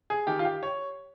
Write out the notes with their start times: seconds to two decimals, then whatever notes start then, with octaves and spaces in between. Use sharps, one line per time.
0.10 G#4
0.27 D#3 G4
0.39 F4
0.45 G4
0.63 C#5